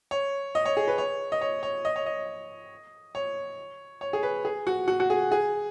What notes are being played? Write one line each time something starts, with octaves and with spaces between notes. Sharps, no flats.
C#5
D#5
C#5
G#4
B4
C#5
D#5
C#5
C#5
D#5
C#5
D#5
C#5
C#5
G#4
B4
G#4
F#4
F#4
F#4
G#4
G#4